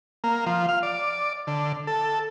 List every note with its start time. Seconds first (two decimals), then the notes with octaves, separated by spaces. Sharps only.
0.24 A#3
0.46 F3
0.69 F5
0.83 D5
1.47 D3
1.87 A4